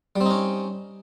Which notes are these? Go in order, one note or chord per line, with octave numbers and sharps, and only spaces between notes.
G3 C4 C#4 D#4